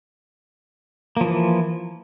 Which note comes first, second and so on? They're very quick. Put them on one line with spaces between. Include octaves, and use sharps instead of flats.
A#3 F3 E3